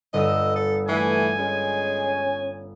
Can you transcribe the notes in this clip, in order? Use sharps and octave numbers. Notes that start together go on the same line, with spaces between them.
G1 D#5 D#6 E6
A4
E3 A3 G#5
G#3 C#4